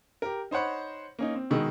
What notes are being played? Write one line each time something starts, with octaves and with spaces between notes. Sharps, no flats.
G4 A#4
D#4 C5 C#5 F#5 B5
A#3 C#4 D#4
C4
B2 D#3 G#3 E6